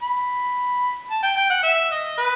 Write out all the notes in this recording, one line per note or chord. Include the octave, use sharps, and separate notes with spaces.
B5
A5
G5
G5
F#5
E5
D#5
B4